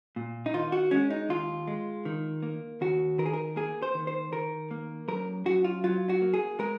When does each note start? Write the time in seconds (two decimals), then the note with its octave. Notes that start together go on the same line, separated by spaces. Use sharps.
0.16 A#2
0.46 D#4
0.54 D#3 F4
0.72 F#4
0.91 G#3 C#4
1.10 D#4
1.29 D#2 F4
1.67 G#3
2.05 D#3
2.43 A#3
2.81 D#2 F#4
3.18 D#3 A#4
3.26 G#4
3.33 A#4
3.56 A#3 G#4
3.82 C5
3.94 D#3
4.07 C5
4.32 D#3 A#4
4.71 A#3
5.08 F#2 A#4
5.46 F#2 F#4
5.64 F4
5.84 F#3 F4
6.09 F#4
6.22 A#3
6.34 G#4
6.59 G#3 A#4